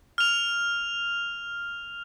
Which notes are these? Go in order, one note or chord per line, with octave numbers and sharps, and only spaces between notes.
F6 F7